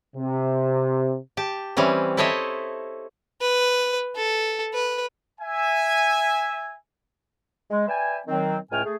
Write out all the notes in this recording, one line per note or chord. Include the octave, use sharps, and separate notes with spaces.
C3
G4 A5
E3 G3 C4 C#4
E4 A4 C5 C#5 D#5 E5
B4
A4
B4
E5 G#5
G#3
B4 D5 E5 G5 G#5
D#3 F#3 C4
C#2 A2 A3 G5 G#5 F6
A3 G#4